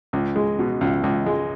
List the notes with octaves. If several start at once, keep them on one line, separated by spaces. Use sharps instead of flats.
C#2
G#3
B2
C#2
C#2
G#3